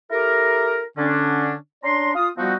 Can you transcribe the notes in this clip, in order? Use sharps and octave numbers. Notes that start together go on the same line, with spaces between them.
E4 G4 A4 A#4
D3 C#4 D4
C#4 D4 D5 A#5 C6
F4 F5 D#6
F3 G3 B3 C4 D#4 F#4